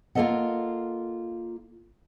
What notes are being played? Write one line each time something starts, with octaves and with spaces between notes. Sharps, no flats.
A#3 F4 G4 A4 D#5 F#5